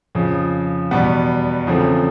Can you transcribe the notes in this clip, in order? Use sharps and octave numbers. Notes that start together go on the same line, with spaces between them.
F2 C#3 F3
E2 B2 G3 B3
E2 C#3 F3 A3 C4